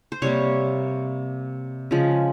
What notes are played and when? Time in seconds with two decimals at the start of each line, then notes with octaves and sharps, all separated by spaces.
0.12 C5
0.22 C3 G3 A#3 C#5
1.91 C#3 F3 G#3